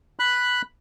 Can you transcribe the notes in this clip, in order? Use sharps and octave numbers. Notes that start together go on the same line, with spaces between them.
B5 F#6